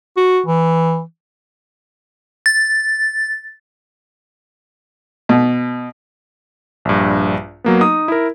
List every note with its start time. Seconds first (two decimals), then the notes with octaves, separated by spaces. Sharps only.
0.17 F#4
0.46 E3
2.46 A6
5.29 B2
6.85 A#1 G2
7.64 F#3 A#3 B3
7.81 D#4 D#6
8.08 E4 A#4